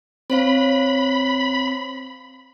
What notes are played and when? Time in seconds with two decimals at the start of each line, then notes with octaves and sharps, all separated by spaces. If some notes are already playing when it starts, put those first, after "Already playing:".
0.30 C4 C5 C#5 F5 B5